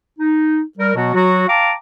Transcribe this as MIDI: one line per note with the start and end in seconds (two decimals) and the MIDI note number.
0.19 0.61 63
0.78 0.95 55
0.78 0.95 70
0.95 1.12 47
0.95 1.12 54
0.95 1.12 59
0.95 1.12 66
1.14 1.48 54
1.14 1.48 66
1.48 1.73 77
1.48 1.73 79
1.48 1.73 81
1.48 1.73 82
1.48 1.73 86